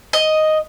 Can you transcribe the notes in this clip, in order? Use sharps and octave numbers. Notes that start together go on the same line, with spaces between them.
D#5